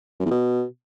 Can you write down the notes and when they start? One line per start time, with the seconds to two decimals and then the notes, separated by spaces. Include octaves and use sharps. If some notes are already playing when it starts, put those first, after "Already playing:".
0.20 F#2
0.25 E2
0.31 B2